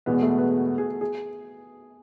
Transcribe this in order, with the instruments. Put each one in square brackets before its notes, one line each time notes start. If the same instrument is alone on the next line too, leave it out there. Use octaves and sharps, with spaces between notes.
[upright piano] E2 B2 G#3 [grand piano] B3
[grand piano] A3
B3
F#4
G#4
G#4